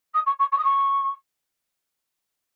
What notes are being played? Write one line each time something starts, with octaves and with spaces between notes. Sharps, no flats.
D#6
C#6
C#6
C#6
D#6
C#6